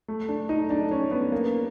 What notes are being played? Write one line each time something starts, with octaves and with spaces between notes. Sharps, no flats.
A3
D4
D#4
D4
C#4
B3
A#3